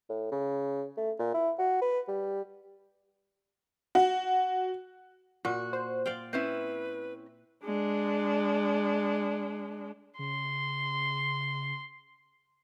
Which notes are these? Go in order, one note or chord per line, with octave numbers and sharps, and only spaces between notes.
A2
C#3
A3
A#2
E4
F#4
B4
G3
F#4
A#2 F#4
C5
D5 F5 G5
C4 C#4 E4 B4
G#3 D4
C#3 C6